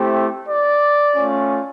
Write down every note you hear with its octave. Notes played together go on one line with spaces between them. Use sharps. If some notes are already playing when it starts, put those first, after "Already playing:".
Already playing: A3 C4 E4 G4
D5
A3 C#4 F4